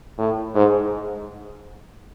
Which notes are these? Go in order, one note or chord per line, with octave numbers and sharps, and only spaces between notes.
A2
G#2